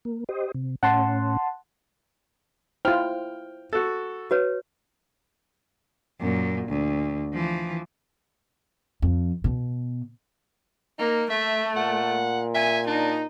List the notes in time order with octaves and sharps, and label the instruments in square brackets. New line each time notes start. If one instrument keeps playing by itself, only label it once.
[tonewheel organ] A#3
G4 C5 D#5
C3
[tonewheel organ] A2 C#4 [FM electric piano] F#5 A5 C6
[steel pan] E4 F4 [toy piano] C5 [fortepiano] G5 F6
[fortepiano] F#4 A4
[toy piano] F#4 B4 C#5
[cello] F#2 A#2
D2
E3 F3
[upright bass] F2
B2
[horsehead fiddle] A#3 [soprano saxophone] D#4
[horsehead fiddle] A3 [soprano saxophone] E5
[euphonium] A#2 [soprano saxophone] F#5
[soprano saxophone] E5 [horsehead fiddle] G#5
[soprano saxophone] D4 [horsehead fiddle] D#4